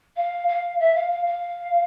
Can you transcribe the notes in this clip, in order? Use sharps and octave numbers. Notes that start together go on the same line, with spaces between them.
F5
F5
E5
F5
F5
F5